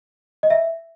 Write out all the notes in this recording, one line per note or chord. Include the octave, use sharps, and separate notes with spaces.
D#5
E5